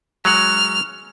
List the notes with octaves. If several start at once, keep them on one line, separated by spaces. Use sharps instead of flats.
F#3 G#3 F#5 F6